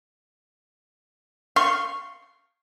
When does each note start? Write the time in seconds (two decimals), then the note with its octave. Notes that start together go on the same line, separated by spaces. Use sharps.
1.56 F5 C6 C#6